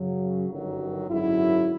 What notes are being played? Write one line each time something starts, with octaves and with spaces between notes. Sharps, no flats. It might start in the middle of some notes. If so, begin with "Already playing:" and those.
Already playing: F#2 C#3 F#3
G1 F#2 D#3 F#3
G#1 F#2 D3 F#3 E4